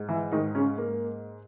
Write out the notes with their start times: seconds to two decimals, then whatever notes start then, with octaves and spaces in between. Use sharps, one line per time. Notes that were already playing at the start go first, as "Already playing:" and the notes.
Already playing: G#2
0.09 E3 E4
0.32 G#2 D#3 D#4
0.55 C#3 C#4
0.78 G#2 A#3